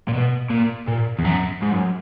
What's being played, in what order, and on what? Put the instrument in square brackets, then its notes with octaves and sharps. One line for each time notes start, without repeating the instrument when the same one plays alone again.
[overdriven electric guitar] A#2
B2
A#2
A#2
E2
F#2
G#2
F#2